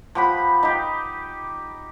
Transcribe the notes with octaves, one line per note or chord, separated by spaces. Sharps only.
F3 G4 F#5 B5
D#4 G4